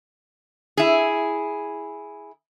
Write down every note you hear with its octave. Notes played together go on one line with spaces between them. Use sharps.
E4 G#4